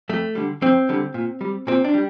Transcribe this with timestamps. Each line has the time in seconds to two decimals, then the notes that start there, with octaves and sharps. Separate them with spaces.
0.09 F2 A3
0.35 D3 G3
0.62 F2 C4
0.89 D3 G3
1.14 A#2
1.41 G3
1.67 A#2 C4
1.85 D4
1.94 G3